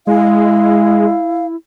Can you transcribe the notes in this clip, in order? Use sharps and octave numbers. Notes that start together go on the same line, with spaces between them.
G#3 E4 F5